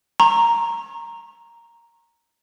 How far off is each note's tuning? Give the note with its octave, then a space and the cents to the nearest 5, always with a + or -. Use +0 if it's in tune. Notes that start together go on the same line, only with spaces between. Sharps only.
A#5 +0 C#6 -40